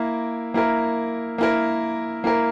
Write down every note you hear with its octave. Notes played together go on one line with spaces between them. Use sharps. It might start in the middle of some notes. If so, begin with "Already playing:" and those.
Already playing: A#3 E4 A#4
A#3 E4 A#4
A#3 E4 A#4
A#3 E4 A#4